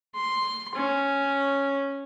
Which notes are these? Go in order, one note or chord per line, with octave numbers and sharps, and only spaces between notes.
C6
C#4